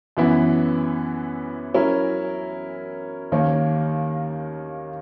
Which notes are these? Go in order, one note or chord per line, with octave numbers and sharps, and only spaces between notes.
F#2 E3 B3 E4
F#3 C#4 E4 A#4 E5
D#2 D#3 A#3 C#4